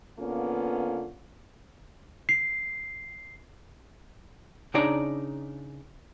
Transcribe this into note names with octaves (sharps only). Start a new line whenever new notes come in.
D3 A#3 B3 C#4 F4
C7
C#3 D4 D#4 C#5 D5 A#5